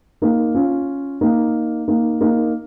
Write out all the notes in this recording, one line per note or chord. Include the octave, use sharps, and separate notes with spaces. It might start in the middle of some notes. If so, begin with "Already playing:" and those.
A#3 D#4
C#4 F4
A#3 D#4
A#3 D#4
A#3 D#4